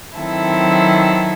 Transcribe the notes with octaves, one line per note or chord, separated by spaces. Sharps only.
D#3 F#3 C4 E4 A4